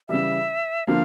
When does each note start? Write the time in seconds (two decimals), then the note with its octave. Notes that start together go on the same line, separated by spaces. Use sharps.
0.09 C#3 E3 G3 E5
0.87 D3 F3 A#3 F5